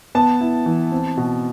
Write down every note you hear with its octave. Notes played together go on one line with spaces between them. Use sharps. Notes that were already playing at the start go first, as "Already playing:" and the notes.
B3 A5
E4
E3
C4
B2